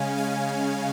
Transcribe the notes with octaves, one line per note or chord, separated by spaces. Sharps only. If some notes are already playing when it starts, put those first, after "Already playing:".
Already playing: C#3 G#3 C#4 F5 G#5
F5 G#5